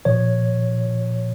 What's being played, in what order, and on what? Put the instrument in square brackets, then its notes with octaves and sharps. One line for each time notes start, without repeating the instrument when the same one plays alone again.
[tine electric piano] A#2 F3 C#5